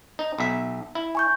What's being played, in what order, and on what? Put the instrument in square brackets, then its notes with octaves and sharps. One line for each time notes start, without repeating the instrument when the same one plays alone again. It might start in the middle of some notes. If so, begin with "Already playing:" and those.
[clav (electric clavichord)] D#4
B1 E5
E4
[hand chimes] G#5 C#6 G6